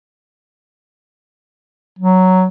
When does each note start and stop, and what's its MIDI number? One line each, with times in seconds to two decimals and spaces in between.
1.99 2.48 54